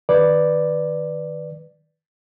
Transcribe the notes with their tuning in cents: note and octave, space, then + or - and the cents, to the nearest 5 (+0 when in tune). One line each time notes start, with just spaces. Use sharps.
D#3 +0 B4 +0 D5 +5